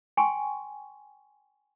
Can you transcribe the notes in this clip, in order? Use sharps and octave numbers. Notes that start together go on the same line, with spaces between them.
G5 G#5 C6 C#6